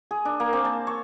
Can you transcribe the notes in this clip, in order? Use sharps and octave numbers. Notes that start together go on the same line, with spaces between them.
G#4
D4
A#3
C4
A5
C#5